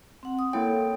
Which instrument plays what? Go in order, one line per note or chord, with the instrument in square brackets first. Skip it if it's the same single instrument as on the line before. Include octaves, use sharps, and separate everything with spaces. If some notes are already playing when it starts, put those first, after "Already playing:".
[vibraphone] C4 F#5
D#6
[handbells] A#3 E4 G5 [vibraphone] A4 C#5